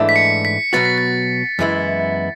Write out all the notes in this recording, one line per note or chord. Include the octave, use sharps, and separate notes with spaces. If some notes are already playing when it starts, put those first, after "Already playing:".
Already playing: G#2 E3 A3 D4
B6
C#7
B6
B2 F#3 B3 F#4 A6
B6
A6
F#2 E3 G#3 B3 E4